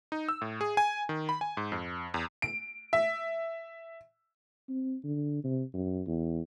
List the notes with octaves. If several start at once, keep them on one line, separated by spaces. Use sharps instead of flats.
D#4
E6
A2
G#4
G#5
D#3
B5
G#5
G#2
F2
E2
D7
E5
C4
D3
C3
F#2
E2